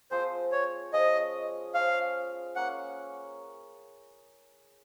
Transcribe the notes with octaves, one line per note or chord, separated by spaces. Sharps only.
F3 G#3 C4 C5
C#5
F3 G#3 C#4 G#4 D#5
F3 G#3 C#4 G#4 F5
A#3 C#4 F#5